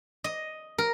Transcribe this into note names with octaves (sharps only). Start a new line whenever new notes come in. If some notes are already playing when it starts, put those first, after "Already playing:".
D#5
A#4